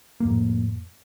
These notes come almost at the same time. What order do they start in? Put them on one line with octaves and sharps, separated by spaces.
A#3 F2 A2